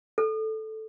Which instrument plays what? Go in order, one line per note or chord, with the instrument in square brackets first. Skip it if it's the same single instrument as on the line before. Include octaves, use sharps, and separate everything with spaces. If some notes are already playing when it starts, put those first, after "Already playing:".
[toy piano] A4